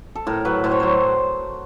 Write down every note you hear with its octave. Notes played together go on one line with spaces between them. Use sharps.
A4
A2 A#4
F#3 B4
A2 C5
C#5
F#3 C5